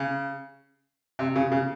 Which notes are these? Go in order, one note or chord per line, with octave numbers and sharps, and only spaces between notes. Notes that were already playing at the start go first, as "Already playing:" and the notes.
Already playing: C#3
C3
C#3
C#3